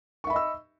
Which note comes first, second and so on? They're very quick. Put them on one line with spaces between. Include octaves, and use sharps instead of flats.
C#6 E5 B5 D#5 E6